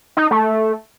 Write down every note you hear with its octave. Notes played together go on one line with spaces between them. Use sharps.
D#4
A3